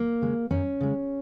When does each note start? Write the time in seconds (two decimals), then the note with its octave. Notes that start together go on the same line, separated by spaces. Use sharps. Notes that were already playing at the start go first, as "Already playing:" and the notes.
Already playing: A#3
0.22 C#3 G#3
0.51 F#2 C#4
0.81 C#3 G#3